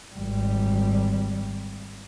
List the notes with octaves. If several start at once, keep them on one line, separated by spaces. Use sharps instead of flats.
G#1 G3